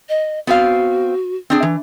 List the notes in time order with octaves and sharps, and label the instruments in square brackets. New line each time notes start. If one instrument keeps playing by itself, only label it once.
[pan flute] D#5
[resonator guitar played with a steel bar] B3 C4 F5 [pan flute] F#4
[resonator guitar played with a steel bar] C4 D4 G#4
E3